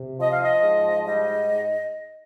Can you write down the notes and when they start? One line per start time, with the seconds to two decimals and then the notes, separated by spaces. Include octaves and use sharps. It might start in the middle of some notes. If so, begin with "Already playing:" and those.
Already playing: C3
0.20 F3 D#5
0.31 F5
0.43 D#5
0.63 G#2
1.06 G3 D#5